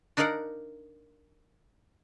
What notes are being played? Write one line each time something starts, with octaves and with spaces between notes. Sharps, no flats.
D4 D#4 A#4 D5 F5 F#5